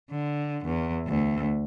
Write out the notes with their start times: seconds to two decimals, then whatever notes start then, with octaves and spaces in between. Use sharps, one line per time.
0.11 D3
0.65 E2
1.07 D2